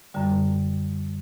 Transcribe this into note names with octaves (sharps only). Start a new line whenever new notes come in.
F#2 D3 G3